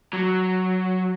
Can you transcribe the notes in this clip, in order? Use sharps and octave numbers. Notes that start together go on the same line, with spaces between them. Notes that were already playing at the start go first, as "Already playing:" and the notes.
F#3